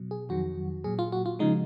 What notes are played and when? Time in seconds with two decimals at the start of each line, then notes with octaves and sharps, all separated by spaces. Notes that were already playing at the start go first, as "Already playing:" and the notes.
Already playing: B2 F#3
0.11 G#4
0.29 F2 D#3 F#3 F#4
0.84 A#2 F#3 G#4
0.99 F4
1.12 F#4
1.26 F4
1.39 C#3 F3 G#3 D#4